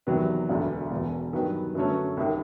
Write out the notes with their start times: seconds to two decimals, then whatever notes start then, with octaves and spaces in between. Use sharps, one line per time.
0.07 E2 C3 D#3 F#3 B3
0.49 E1 D2 D3
0.91 E1 E2 B2
1.33 G2 D#3 F#3 B3
1.75 F#2 D3 F#3 A3 C#4
2.17 C2 C3 D#3